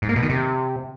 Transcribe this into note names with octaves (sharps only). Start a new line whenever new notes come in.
G#2
A#3
B2
D#3
C3